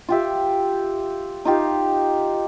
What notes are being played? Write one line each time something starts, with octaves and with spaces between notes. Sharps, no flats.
F4 G4 E5
D#4 F4 G4